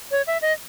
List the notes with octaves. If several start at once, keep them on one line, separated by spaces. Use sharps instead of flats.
C#5
E5
D#5